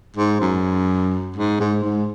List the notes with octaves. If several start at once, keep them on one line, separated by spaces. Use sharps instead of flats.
G#2
F#2
G#2
G#2
G#2